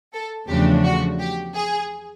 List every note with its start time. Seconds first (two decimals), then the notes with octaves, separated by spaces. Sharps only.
0.13 A4
0.48 E2 C#3 F3 A3 D4 G4
0.83 F#4
1.19 G4
1.54 G#4